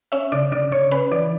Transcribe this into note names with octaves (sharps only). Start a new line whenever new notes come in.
C#4 E5
C#3 D5
C#3 D5
C#3 C#5
C#4 B4
E3 D5